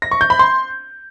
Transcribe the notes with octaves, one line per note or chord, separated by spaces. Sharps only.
A#6
C#6
G6
B5
C6